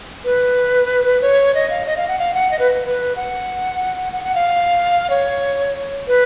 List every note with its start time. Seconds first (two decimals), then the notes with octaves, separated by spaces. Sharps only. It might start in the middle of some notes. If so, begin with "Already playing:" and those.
0.24 B4
1.21 C#5
1.54 D#5
1.70 F5
1.86 D#5
1.97 F5
2.08 F#5
2.19 F5
2.34 F#5
2.51 D#5
2.59 B4
2.84 B4
3.16 F#5
4.13 F#5
4.24 F#5
4.35 F5
5.10 C#5
6.07 B4